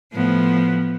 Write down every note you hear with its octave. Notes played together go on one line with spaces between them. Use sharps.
A2 F3 B3